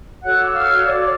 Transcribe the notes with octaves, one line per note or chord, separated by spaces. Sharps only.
F#4 A4 C#5 F#5 F#6
D6
F5 F6
D5 D6